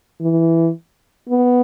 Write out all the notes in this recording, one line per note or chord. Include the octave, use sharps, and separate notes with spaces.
E3
B3